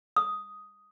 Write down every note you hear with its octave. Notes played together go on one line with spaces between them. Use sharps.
D#6